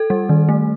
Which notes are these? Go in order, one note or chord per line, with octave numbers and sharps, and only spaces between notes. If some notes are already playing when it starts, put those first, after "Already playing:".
Already playing: A4
G3
D#3
A3